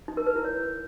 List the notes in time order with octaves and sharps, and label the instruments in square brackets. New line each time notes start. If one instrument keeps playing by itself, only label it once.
[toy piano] D#4
A#4
B4
E4
C#5